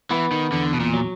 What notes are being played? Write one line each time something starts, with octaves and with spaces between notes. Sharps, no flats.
E3 B3
D#3
E2 D3
B2
A#2
F#3